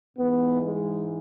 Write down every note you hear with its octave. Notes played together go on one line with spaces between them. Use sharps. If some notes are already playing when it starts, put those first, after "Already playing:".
G#2 E3 B3
G#3